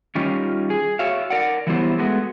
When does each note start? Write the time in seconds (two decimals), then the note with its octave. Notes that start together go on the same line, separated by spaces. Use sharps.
0.15 D#3 G3 C#4 D#4 F4
0.70 G#4
0.99 F#4 C#5 E5 F5
1.30 A#4 D5 F#5
1.67 E3 F#3 G3 B3 E4 C5
1.98 G#3 A3 B3 F#4